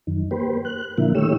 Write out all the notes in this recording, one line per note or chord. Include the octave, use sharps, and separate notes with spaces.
F#2 D#3
A#3 G4 B4 C5
F#6
A#2 D3 F3 A#3 E4
D#3 A3 G4 C#5 E6